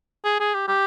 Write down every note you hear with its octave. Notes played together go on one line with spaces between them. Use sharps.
G#4
G#4
G4
G4